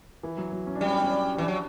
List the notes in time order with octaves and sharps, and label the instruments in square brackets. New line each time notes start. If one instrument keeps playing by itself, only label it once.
[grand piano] E3
F#3
F#3
C#4
D4
[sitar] G3 [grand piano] C#4
[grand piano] D4
C#4
[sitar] E3 [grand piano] D4
[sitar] F#3